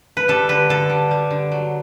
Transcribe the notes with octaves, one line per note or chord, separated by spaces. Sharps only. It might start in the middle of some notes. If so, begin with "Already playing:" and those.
B4
G3 A4
D3 B4
D3 A4
G3
G3
D3
F#3